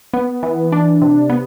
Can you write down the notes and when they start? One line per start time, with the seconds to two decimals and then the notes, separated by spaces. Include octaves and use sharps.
0.13 B3
0.43 E3
0.72 D4
1.02 C3
1.30 B3